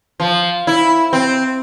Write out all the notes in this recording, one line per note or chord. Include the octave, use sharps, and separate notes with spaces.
F3
E4
C4